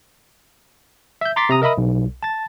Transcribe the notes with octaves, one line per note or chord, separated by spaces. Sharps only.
E5 G6
A#5 C6 D6 A6 B6 C7
C3 A#5 D#6
A#4 D#5 E5 B5 D#6
B1
A5 A6